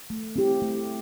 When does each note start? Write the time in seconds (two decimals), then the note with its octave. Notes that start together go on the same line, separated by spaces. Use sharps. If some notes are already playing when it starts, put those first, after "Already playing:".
0.10 A3
0.36 C4 E4 G4
0.62 A3